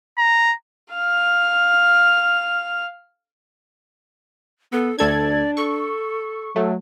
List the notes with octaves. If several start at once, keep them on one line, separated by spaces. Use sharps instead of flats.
A#5
F5 F6
B3 A4
D2 D4 A4 D5 G#6
A4 C#6
F#3 A3